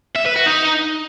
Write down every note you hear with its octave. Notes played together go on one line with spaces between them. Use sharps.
E5
B4
F#4
D#4